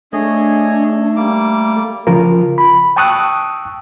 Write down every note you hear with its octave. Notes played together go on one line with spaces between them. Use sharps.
A3 D4 G#4 C#5 D#5
G3 A#3 D6
C#3 F3 F4 A#4
B5
G5 A5 C#6 D#6 E6 F#6